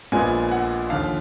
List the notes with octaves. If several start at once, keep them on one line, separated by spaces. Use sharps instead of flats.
A#1 A#2 G#3 B3 F4 G#5
F#5
D#2 D3 F3 F5